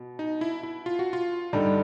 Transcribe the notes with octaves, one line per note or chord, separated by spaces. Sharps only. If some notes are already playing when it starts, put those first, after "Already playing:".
Already playing: B2
D#4
E4
E4
F4
F#4
F4
G2 D3 G3 D#4